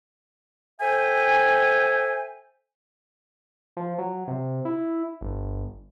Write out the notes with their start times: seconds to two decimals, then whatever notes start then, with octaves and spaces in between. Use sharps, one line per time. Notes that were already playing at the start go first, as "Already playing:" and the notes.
0.81 A4 C5 E5 G5 G#5
3.77 F3
3.98 F#3
4.27 C3
4.65 E4
5.21 G1